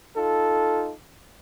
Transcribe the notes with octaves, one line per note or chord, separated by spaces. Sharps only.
D#4 F4 A4